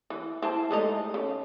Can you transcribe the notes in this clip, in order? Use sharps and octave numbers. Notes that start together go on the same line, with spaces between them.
E3
E4 C5 A5
G#3 A3 D#4
C#3